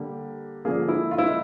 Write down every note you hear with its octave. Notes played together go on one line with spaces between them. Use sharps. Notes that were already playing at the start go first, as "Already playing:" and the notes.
Already playing: D3 G3 A#3 G4
D3 F3 A#3 G#4
E4
F4
E4
D#4